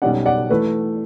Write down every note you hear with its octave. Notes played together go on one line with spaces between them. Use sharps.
B1 B2 G3 C#4 D5 F#5
D5 F#5
E3 A3 B4